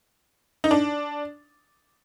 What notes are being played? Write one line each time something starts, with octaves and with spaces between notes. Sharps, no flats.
D#4
D4